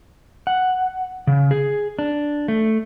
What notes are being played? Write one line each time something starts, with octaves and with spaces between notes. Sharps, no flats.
F#5
C#3
G#4
D4
A3